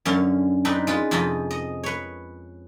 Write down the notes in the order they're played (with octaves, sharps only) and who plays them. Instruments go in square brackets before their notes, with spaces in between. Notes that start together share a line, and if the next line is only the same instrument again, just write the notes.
[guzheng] F#2 D3 C#4 F5
C4 D4 D#4 B4
G#3 F4 B4
F2 C3 F4 D#5 B5
D#5
B4 C#5